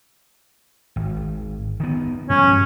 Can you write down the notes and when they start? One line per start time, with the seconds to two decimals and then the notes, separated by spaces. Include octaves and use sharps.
0.96 G#1
1.80 D#3 B3
2.30 G2 F3 G#3 C#4